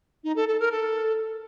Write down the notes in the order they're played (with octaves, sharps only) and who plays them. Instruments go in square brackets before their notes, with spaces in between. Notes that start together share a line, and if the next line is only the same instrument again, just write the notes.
[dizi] D#4
A4
A4
A#4
A4